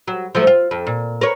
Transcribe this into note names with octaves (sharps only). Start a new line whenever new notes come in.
F#3
F3 F#3 A3
F4
F2
A#2
A#4 B4 C#5